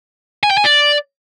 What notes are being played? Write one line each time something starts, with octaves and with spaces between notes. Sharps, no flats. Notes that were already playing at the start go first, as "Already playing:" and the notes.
G#5
G5
G#5
D5